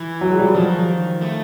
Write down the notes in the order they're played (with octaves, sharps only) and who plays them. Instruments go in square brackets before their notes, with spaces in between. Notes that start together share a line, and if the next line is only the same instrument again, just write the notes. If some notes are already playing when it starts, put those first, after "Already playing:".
Already playing: [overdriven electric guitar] E3
[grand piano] F#3
G#3
G3
F#3
[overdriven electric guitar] D#3 [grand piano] F3
[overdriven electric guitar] A3